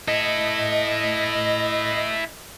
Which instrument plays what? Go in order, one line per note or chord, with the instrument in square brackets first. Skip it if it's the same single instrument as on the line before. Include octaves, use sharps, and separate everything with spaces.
[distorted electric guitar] E4 A4 [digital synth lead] D#5